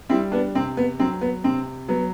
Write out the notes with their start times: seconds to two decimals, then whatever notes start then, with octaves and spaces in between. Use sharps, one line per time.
0.09 G3 C4 E4
0.32 B3 D4
0.55 C3 C4
0.77 B3
1.00 F#3 C4
1.21 B3
1.44 C3 C4
1.88 F#3 B3